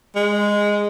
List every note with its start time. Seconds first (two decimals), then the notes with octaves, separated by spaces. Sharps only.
0.16 G#3